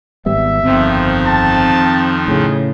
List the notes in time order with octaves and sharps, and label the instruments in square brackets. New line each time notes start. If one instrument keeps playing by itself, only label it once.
[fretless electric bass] G#1 G3 B3 [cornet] E5
[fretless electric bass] G1 [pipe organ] F2 D#3 F3 [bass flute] C4
[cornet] A5
[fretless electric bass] A2 C#3 [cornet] G#4